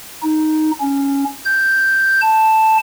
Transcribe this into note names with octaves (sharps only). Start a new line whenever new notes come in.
D#4
C#4
G6
A5